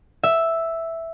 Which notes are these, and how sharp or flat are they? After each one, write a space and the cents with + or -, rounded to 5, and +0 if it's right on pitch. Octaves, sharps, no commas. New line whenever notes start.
E5 +0